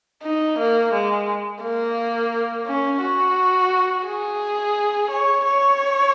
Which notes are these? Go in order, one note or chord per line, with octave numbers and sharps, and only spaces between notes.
D#4
A#3
G#3
A#3
C#4
F#4
G#4
C#5
C#5